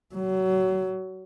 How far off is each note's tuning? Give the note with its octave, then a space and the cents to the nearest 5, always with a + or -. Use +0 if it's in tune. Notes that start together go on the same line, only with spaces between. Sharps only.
F#3 +25